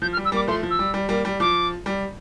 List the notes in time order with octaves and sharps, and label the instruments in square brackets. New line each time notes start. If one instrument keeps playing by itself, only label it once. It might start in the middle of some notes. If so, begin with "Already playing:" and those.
[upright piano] F3 [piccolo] G6
[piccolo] F6
[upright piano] G3
[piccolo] E6
[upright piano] G3 A#3 [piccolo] D6
[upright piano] F3 A3 [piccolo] C6
[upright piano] F3
[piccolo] E6
[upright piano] G3
G3
G3 A#3
G3
[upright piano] F3 [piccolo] D6
[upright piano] G3